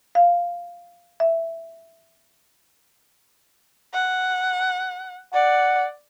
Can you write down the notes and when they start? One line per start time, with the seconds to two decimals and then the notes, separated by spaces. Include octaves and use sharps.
0.15 F5
1.20 E5
3.93 F#5
5.34 D5 F#5